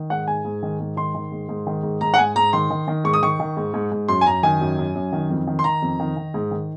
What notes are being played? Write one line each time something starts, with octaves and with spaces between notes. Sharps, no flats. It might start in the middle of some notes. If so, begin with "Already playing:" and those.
Already playing: D#3
G#2 F#5
G#2 G#5
G#2
D#3
G#2
D#3 C6
D#3
G#2
G#2
D#3
G#2
G#2 A#5
F#5
G#2 G#5
G#2 A#5
D#3 C6
D#3
D#3
G#2 C#6
D#6
D#3 C#6
D#3
G#2
G#2
G#2
F#2 C6
G#5
F#2 A#5
D#3 G#5
F#2
F#2
F#2
D#3
F2
D#3
C6
D#3 A#5
F2
D#3
D#3
G#2
D#3